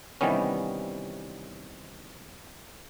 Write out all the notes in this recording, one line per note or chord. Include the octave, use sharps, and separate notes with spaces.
C3 D#3 E3 G3 B3 C#4